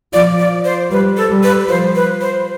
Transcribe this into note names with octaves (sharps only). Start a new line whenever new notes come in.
F3 D5
D5
C5
G3 B4
A4
G3
B4
F3 C5
B4
C5